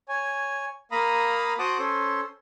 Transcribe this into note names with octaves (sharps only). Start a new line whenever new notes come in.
C#5 G#5
A#3 F5 A#5 B5 D#6
F#4 C5 F#5 A5 D6 D#6
C#4 A4 C5